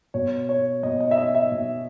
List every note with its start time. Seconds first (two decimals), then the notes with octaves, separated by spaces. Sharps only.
0.14 B2 C#5
0.49 C#5
0.83 B2 D#5
1.00 D#5
1.11 E5
1.17 D#5
1.35 E5
1.52 B2